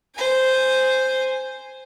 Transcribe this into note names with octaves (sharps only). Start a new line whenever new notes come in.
C5 G#5